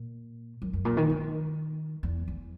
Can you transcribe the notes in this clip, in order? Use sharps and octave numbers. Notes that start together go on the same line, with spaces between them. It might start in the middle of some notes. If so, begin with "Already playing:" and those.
Already playing: A#2
F#2
F#2
A#2
D#3
D#3
E2
E2